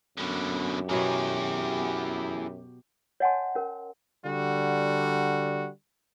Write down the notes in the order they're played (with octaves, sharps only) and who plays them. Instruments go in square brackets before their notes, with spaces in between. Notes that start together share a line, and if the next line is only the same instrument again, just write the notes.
[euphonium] F#2 [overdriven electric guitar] B2 D3
[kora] B2 F#3 A#4 [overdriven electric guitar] E4 G#4 [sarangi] G4
[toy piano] C#5 D#5 F#5 G#5 A5 C6
C#4 A#4
[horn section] D3 G3 F#4